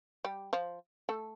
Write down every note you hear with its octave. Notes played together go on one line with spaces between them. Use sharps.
G3 G4
F3 F4
A3 A4